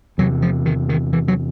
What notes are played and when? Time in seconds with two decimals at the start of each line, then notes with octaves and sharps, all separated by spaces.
0.18 E2 C3 F#3
0.42 F3
0.66 D#3
0.89 D#3
1.13 E3
1.28 F#3